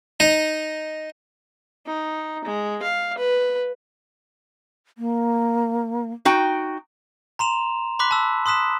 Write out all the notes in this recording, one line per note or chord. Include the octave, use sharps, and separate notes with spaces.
D#4
D#4
G#3
F5
B4
A#3
D#4 F#4 G5
A#5 C6 E7 F7
B5 C6 D6 F#6 B6
A5 E6
C6 D#6 F#6 B6 E7